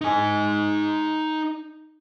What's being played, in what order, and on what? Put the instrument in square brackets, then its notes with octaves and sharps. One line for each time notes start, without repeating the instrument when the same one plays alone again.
[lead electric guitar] D#4 G#5